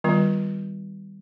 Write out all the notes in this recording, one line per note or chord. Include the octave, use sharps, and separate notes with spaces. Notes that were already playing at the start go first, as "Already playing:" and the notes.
D#3 G3 B3 F4